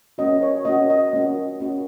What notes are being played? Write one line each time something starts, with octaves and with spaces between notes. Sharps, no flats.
A#3 C#4 F#4 D#5
C#5
A#3 C#4 F#4 D#5
D#5
A#3 C#4 F#4
A#3 C#4 F#4